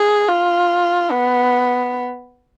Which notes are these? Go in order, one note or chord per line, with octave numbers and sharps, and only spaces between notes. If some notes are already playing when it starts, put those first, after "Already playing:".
Already playing: G#4
F4
B3